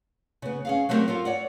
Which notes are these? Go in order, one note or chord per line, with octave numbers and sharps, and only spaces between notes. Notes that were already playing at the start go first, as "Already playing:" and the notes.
C#3 B3
C#4 G#4 F5
F#3 A3 B3 C4 G4 A#4
F4 A4 A#4
C#5 D5 F#5